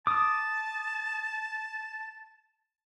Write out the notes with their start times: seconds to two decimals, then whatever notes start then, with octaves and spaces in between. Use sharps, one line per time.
0.07 A5 D6 D#6